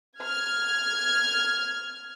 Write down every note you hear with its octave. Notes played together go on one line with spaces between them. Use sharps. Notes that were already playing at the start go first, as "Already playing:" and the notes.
F6 G#6